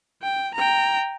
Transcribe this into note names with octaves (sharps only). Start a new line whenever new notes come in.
G5
G5 A#5